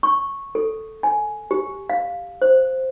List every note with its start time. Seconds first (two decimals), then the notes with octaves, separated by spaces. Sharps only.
0.03 C#6
0.55 A4
1.03 G#5
1.51 G4
1.90 F5
2.42 C5